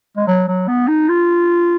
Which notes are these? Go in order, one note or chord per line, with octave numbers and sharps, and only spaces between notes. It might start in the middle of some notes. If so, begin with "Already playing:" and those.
G#3
F#3
F#3
B3
D#4
F4